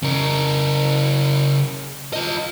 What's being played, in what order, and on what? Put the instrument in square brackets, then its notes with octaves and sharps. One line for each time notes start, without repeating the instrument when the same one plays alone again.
[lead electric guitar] C#3 A#4
F4 D#5